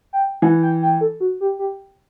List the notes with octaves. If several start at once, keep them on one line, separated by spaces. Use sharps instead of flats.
G5
E3 F#5
G5
G5
A4
F#4
G4
G4